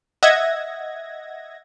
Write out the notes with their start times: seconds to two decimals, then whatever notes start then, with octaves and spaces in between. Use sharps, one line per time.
0.23 D#5 E5 F#5 G#6 A#6